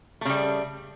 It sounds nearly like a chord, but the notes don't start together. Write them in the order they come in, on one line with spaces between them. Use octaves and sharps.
A3 C#3 G3